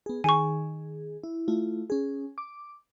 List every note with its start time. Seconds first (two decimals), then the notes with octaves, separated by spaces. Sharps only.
0.06 B3 G#4
0.24 D#3 G#4 G#5 C#6
1.24 E4
1.48 A3 E4 F4
1.90 C#4 G#4
2.38 D6